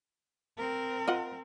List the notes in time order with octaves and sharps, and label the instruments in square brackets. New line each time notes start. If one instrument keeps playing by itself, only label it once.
[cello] C4 A#4
[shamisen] F4 D#5 F#5